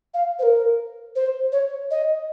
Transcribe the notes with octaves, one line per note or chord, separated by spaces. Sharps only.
F5
C5
A#4
C5
C#5
D#5